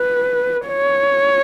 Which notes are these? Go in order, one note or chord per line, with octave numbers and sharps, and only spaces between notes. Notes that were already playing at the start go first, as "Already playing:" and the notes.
Already playing: B4
C#5